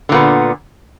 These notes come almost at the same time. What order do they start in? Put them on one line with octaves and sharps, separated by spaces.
D3 A#2 B3